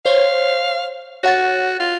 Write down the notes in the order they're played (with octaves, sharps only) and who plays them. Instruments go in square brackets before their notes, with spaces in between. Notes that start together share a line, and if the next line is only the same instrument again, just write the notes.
[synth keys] C5 C#5 [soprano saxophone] F5
[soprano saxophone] F#4 [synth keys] C#5 F#5 A6
[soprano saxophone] F4